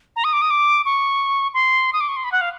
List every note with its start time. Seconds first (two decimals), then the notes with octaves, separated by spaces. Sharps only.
0.16 A#5
0.24 D#6
0.33 D6
0.42 D#6
0.50 D6
0.85 C#6
1.54 C6
1.93 D#6
2.01 D6
2.09 C#6
2.16 C6
2.24 B5
2.32 F#5
2.41 F5